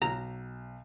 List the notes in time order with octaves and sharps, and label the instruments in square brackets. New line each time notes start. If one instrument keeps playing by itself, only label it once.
[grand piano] B1 [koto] A#5